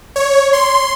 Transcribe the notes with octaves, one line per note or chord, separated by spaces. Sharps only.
C#5
C6